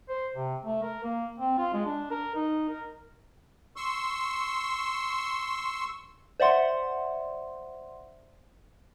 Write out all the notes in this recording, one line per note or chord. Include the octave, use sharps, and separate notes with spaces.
C5
C3
A3
A#4
A#3
C4
F4
G#3
D4
A#4
D#4
A#4
C6 C#6 E6
C5 D5 E5 F#5 C6